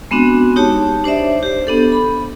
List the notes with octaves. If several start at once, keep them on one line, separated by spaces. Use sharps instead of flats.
G#3 B3 C4 D4 F#4
D#4 G4 C#5 A5
D4 C5 D5 E5
G4 C5
B3 D4 A4
B5